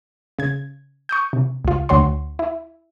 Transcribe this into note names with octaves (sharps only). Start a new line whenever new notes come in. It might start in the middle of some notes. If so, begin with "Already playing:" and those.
C#3 G#6
C#6 D#6 G6
C3
C#2 F4
D2 D3 F#4 C#5 C6
E4